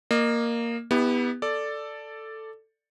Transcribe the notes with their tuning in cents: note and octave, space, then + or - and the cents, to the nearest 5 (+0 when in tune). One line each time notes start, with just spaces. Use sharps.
A#3 +0 D#5 -35
B3 +0 E4 -35 G4 +30
A4 +5 D5 +0